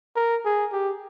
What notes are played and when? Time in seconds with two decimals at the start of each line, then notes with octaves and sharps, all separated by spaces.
0.16 A#4
0.45 G#4
0.73 G4